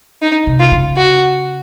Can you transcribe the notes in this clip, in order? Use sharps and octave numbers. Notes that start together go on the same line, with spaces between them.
D#4
C3
F4
C#3
F#4